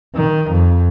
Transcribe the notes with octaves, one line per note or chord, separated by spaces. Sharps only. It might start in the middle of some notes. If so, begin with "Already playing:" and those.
D#3
F2